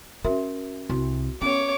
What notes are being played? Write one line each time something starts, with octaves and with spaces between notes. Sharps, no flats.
C#4 F#4 A#4 E5
C2 F#4
B3 C#4 C#5 D6